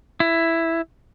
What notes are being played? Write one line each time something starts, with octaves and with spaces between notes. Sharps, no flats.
E4